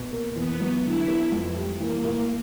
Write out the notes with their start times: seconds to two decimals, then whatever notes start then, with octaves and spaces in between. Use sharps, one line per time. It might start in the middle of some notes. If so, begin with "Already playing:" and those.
Already playing: B2
0.11 A#3
0.36 E2 B3
0.60 F#3
0.84 D3 E4
1.08 B3
1.32 F2
1.56 G3
1.80 E3 A#3
2.04 A2